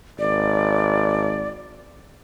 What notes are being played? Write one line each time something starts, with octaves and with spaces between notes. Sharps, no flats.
G#1 D5